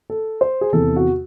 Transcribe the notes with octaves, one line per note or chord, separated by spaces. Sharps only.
A4
C5
G#4
E2 C3 E3 A4
F#4